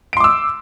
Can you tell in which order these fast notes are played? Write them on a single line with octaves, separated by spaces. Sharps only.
D7 C6 D6 E6